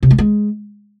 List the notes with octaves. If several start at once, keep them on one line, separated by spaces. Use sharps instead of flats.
C3
A3
G#3